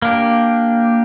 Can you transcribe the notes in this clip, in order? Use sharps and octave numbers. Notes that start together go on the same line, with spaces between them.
A#3 D4 G4